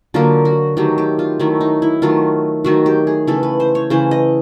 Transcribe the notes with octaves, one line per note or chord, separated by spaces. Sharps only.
D3 F#3 A#3 F4
F#4
D#3 F#3 A3 G4
G4
F4
D#3 F#3 A3 E4
D#4
E4
D#3 F#3 A3 F4
D#3 F#3 A3 F#4
G4
G#4
C#3 E3 A3 A4
B4
C5
C#5
C#3 E3 A3 C5
D#5